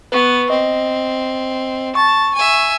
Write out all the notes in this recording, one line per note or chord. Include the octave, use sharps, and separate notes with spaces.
B3 B4 C#6
C4 D#5
A5 C#6
E5 G#5